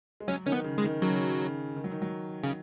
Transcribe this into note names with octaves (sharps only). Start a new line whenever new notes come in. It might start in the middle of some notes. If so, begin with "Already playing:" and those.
G#3
F#3 C#4
D#3 C#4
B3
C#3
G#3
D#3
C#3 F#3
D#3
F#3
D#3
F#3
C#3